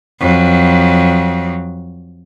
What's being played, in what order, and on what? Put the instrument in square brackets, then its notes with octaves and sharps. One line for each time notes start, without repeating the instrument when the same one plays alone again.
[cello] F2 F#3